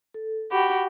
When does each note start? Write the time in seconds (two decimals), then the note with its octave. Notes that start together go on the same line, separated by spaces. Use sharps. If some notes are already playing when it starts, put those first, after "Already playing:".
0.14 A4
0.51 F#4 G4 B5